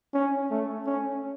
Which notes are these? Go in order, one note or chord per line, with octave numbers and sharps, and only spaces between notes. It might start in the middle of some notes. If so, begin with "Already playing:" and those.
C#4
A3
C#4